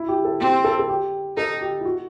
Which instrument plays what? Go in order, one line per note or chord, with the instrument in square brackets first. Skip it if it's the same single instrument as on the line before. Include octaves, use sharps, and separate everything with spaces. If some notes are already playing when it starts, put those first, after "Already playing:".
Already playing: [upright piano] E4
G4
A4
[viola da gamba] C4 [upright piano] G4
[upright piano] A4
A4
G4
[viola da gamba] D#4 [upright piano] A4
[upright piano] G4
E4
F#4